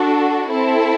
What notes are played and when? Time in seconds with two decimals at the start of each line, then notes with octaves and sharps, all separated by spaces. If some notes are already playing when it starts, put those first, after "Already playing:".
Already playing: D4 F#4 A4
0.49 C4 E4 A4